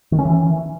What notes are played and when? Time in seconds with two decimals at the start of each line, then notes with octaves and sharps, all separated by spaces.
0.12 D#3
0.19 C#4
0.25 E3